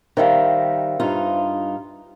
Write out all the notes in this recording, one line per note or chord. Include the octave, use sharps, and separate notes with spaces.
D#3 G3 C5 E5 F5
G2 D#4 F4